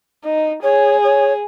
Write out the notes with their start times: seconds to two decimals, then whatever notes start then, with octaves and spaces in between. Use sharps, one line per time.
0.24 D#4
0.63 G#4 C#5
1.04 C#5